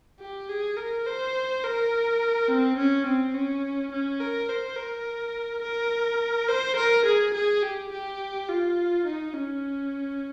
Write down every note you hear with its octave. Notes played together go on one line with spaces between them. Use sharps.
G4
G#4
A#4
C5
A#4
C4
C#4
C4
C#4
C#4
A#4
C5
A#4
A#4
C5
A#4
G#4
G#4
G4
G4
F4
D#4
C#4